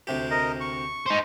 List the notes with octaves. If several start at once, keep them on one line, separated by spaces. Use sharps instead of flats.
D2 C3 G4
A#4 D#5
C#6
D#4 C5